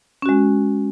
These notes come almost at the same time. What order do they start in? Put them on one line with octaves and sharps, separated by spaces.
C#4 F#4 G#3